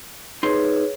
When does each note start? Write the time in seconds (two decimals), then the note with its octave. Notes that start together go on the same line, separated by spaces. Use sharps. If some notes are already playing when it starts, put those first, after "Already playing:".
0.43 D#4 G#4 B4 C#5 C6